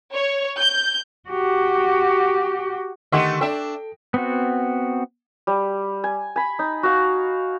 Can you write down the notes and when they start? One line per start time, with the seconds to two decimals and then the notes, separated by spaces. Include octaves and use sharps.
0.14 C#5
0.59 G6
1.29 F#4 G4
3.12 D3 D#3 A3 G4 D#5 E5 F#5 C6
3.41 D4 A4 E5 G5
4.14 B3 C4 F#4
5.47 G3
6.04 G#5
6.36 G#5 B5
6.59 D#4
6.83 F#4 F5